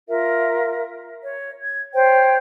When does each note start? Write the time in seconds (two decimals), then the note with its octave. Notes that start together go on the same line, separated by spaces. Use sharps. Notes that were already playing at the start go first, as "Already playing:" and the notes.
0.08 F4 A#4 E5
1.23 C#5
1.61 G#6
1.94 C5 C#5 G5